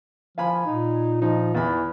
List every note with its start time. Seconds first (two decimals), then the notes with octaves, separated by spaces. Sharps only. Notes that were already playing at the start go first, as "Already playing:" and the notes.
0.38 F3 F5 G#5 B5
0.66 A#2 D#4
1.22 F3 D#4
1.55 E2 E3 B5